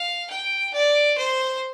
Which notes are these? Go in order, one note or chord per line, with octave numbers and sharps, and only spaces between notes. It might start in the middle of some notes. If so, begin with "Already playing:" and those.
Already playing: F5
G5
D5
C5